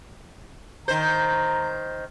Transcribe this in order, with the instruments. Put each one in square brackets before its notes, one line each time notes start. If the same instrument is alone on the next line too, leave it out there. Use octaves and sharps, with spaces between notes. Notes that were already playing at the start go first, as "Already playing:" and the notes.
[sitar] D#3 C5 [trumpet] A#5